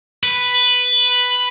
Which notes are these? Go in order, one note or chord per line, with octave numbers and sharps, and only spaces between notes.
B4